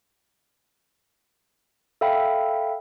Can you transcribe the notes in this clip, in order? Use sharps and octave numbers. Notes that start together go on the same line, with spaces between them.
A4 E5 F5 G5 B5